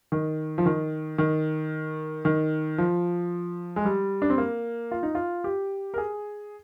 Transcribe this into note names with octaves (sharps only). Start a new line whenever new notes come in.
D#3
F3
D#3
D#3
D#3
F3
G#3
G3
D4
C4
A#3
F4
D#4
F4
G4
A#4
G#4